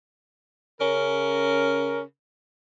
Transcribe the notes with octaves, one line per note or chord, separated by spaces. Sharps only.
C#3 C#4 A#4